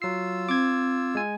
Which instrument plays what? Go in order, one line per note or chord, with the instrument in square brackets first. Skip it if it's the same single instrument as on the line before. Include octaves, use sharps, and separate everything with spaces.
[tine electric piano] F#3 C7 [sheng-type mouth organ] F4 E6
[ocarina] C4 [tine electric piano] D6 G#6
[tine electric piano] G#3 G#5